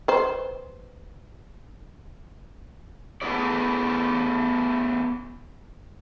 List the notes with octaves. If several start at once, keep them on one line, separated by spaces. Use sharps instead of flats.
B4 C5
A3 B3 E4 G#4 D5